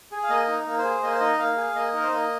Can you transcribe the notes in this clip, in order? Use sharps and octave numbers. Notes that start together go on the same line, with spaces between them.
G#4
F5
A#3 D#5
D#4
A#3
C5
G#4
A#3 D#5
C5
D#4 D#5
A#3 F5
G#4
A#3 D#5
D#4 A#4
C5
A#3 D#5